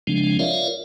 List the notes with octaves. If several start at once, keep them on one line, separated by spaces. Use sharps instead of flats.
C#3 F3 G#3 C4 D4
F4 A#4 C#5 D5 E5 F5